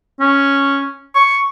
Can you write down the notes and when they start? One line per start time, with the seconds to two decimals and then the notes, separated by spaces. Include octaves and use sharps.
0.20 C#4
1.15 C#6